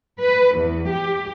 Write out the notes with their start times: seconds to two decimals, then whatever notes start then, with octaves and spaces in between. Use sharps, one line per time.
0.21 B4
0.57 E2
0.91 G4